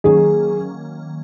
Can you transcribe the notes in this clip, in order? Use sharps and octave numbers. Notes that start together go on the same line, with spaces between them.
D#3 F#3 A#3 C#4 G#4